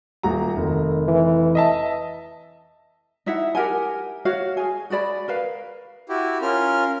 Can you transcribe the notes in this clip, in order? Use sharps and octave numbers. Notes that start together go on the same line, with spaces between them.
D#1 F#4 A#5
F1 D#3
E3
D#5 E5 A5
D#4 E4 E5 F#5
G4 A#4 F#5 G#5
F#4 C#5 F5
G#4 G#5
F#4 G#4 D5 B5
A#4 B4 F5
E4 F#4 G4
C#4 F4 A#4 F6